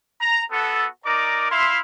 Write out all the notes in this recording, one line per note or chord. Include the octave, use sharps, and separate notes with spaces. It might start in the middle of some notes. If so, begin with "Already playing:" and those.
A#5
B3 F#4 A4
D#4 A#4 D5 A#5 D6
E4 E5 F5 C6